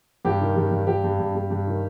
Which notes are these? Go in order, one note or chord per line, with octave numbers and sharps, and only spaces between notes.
G2 G4
D#3
G2
G2
G2 G4
G2
G2
G2
G2
D#3